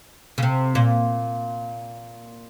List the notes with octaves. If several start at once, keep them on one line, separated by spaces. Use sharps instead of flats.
C#3
C3
A#2